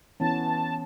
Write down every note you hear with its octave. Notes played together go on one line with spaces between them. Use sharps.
E3 B3 C#4 A5